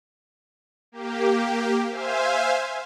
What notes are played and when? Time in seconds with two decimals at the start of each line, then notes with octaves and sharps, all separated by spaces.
0.92 A#3 G4
1.91 C5 E5 F5 G#5